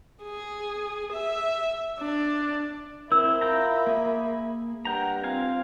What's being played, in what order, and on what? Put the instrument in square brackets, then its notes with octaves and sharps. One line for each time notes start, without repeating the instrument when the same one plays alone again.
[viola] G#4
E5
D4
[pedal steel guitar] C4 E4 [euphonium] A#4 [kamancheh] E5 B5 [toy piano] E6
[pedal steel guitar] F4 G5 A#5
A#3 G#4
[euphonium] G2 [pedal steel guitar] A#4 G5 A#5 [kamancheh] F#5
[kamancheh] C4 F4 [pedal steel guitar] F5 G#5